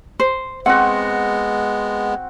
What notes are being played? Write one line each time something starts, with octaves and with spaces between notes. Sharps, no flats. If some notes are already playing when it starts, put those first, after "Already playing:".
C5
G#3 B3 C4 F#4 F#5